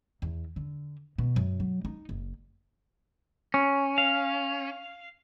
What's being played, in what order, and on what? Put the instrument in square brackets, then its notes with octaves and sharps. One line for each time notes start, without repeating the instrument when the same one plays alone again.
[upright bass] E2
D3
B2
F#2
F#3
D#4
F#1
[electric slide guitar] C#4
[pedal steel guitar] F5